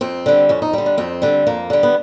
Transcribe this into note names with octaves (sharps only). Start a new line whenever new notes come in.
F2 C4
D3 G3
F2 C#4
D#4
D3 G3
D4
F2 C4
D3 G3
F2 A#3
D3 G3
B3